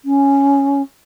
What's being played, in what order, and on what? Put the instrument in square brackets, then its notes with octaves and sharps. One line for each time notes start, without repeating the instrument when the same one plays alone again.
[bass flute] C#4